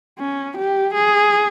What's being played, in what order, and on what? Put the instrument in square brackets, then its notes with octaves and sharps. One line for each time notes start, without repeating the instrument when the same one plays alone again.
[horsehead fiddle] C#4
G4
G#4